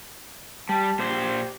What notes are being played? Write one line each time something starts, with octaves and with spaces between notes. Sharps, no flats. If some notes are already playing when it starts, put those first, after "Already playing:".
G3 A5
A#2 G4 C5